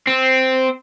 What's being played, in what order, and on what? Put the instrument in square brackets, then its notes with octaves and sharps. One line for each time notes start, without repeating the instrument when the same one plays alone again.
[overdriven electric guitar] C4